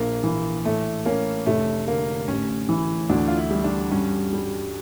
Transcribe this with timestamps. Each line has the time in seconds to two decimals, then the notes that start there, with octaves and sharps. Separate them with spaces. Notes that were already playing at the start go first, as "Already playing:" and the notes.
Already playing: A#1 A#3
0.23 E3
0.65 A2 A3
1.05 A#3 C#4
1.46 F1 A3
1.87 D3 A#3
2.28 A1 C#4
2.69 E3
3.09 D2 D4
3.28 F4
3.37 E4
3.51 G3
3.64 D4
3.91 G2 C#4
4.33 G3